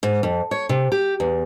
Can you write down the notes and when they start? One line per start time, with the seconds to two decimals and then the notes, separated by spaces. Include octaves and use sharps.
0.03 G#2
0.23 F2
0.51 C#5
0.69 C3
0.92 G4
1.20 E2